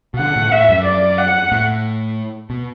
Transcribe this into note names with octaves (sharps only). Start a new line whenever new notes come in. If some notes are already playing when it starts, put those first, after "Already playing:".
B2
D3 F#5
A2
A2 E5
F#2
D5
F#5
A2
B2